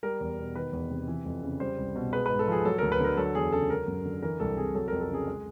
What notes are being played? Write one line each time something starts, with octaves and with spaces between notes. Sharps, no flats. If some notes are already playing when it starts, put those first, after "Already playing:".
G3 A#4
E2
B2
D#3 B4
E2
C3
E3
F2
C#3
G3 C5
C2
B2
G#3 B4
G#2 B4
A4
F3 G#4
F#3 A4
D2 A#4
B4
D3 A#4
F#3 A4
E2 G#4
C#3 A4
F#3 A#4
F#2
D3
E3 A#4
C2 A4
C3 G#4
F#3 A4
F2 A#4
A4
C#3 G#4
G#3